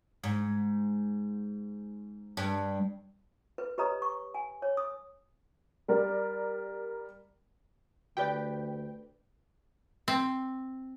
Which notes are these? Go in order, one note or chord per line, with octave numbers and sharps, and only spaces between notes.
G#2
G2
B4
G4 B4 C#5 D#5 A#5 D#6
C#6
G#5
C#5
D#6
G3 A#4 D5
D2 G4 B4 D5 G5
C4